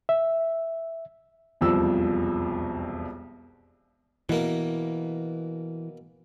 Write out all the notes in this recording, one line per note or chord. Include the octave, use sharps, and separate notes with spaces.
E5
E1 C2 F2 F3 E6
B2 E3 A#3